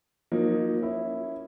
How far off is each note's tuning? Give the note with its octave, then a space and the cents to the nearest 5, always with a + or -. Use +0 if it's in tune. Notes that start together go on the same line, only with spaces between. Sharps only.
F3 +45 A#3 +15 D#4 +0
C#4 +0 E4 +0